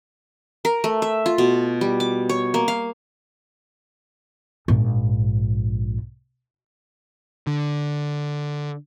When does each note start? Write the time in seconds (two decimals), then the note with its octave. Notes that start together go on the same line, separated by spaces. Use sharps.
0.65 A#4
0.84 A3
1.02 E5
1.26 F4
1.38 B2
1.81 G3
2.00 D6
2.29 C#5
2.54 A#3
2.68 F5
4.68 A#1 G#2
7.47 D3